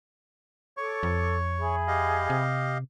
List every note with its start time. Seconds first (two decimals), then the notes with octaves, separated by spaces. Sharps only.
0.77 A4 C#5 C#6 D6
1.03 F2
1.59 G#4 E5 B5
1.88 G4 D#5 F5
2.30 C3